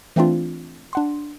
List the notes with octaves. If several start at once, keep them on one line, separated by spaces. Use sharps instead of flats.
E3 A3 C4 D4 F4
D4 F#5 C6